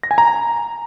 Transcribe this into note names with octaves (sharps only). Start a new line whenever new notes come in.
A#6
G#5
A#5